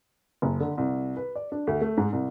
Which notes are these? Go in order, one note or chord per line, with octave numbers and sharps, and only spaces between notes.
F#1
D3
C2
B4
D5
D4
D2
A3
G#2
C2